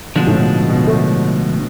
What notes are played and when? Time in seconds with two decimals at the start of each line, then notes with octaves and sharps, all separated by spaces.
0.16 B2 D3 F3 G#3 D4
0.27 A2
0.34 B2
0.69 B2
0.87 A3